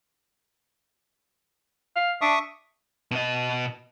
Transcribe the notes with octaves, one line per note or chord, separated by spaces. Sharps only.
F5
D4 E5 C#6 D#6
B2 D#5